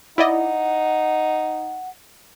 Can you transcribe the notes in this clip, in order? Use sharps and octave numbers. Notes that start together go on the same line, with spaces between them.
D#4 E4 D5 D#5 F#5